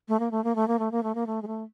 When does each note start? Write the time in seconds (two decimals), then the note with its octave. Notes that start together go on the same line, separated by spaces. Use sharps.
0.08 A3
0.20 A#3
0.31 A3
0.44 A#3
0.55 A3
0.68 A#3
0.79 A3
0.92 A#3
1.03 A3
1.15 A#3
1.27 A3
1.42 G#3
1.47 A3